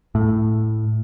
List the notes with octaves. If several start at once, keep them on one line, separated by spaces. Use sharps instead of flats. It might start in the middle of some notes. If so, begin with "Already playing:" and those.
A2